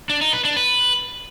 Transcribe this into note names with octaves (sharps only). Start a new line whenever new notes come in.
D4
D#4
B4
D4
B4